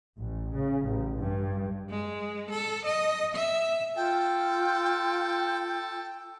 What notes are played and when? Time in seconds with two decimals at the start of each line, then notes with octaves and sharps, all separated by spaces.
0.18 A1
0.55 C#3
0.85 A1
1.18 G2
1.90 G#3
2.50 A4
2.86 D#5
3.36 E5
3.96 F4 A4 G5